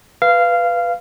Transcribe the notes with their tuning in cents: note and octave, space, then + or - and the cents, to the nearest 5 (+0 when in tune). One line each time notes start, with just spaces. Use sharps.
B4 +0 F5 -15